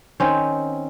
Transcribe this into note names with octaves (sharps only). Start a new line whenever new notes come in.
D#3 C4 C#4